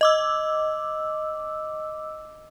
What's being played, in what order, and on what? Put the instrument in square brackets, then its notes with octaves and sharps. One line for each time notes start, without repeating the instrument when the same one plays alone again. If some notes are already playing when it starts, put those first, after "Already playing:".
[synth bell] D#5 D6 E6